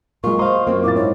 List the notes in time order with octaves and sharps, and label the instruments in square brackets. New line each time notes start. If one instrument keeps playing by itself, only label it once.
[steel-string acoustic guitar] A#2 F4 [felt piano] G#3 A#3 [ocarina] C#6
[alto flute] C5 [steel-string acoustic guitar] D#5 F5 [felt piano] C6
[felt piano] F#2 [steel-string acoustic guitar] A#3 C4 F4
[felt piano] A#2 F5 A6 [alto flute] E4 [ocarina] D6
[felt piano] G#2 [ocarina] C#5